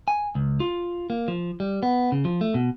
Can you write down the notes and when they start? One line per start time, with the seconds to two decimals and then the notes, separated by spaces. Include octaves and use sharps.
0.08 G#5
0.35 C#2
0.60 F4
1.10 A#3
1.28 F3
1.60 G3
1.83 B3
2.12 C#3
2.25 F3
2.41 A3
2.54 B2